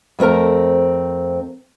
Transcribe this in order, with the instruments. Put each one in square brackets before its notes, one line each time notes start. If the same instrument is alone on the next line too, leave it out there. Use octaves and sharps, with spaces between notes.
[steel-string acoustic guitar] F2 A3 C4 A#4 A#5